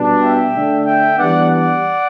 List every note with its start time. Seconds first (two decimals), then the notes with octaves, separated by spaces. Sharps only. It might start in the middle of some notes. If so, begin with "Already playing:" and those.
Already playing: B2 G3 B3 D4
0.21 E5 G5
0.54 D3 A3 D4
0.85 E5 G5
1.18 E3 G3 B3 D4 D5 F#5
1.50 D5 F#5